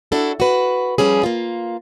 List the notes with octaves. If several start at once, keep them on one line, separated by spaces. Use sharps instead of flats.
D4 E4 F#4 A4
F#4 B4
F3 G3 C#4 G#4
A#3 F4